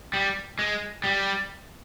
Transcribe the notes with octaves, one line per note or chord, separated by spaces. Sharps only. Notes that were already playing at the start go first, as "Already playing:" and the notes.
G3
G#3
G3